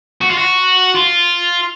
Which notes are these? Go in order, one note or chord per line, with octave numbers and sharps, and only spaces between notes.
F#4
F4
F#4
F4